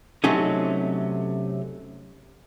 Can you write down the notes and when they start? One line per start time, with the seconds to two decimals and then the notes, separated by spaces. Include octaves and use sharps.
0.24 C3 F#3 A3 C#4 D#4